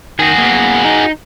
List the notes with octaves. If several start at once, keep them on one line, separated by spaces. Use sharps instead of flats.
D#3 F#4 G#4
A#3 B3
D#4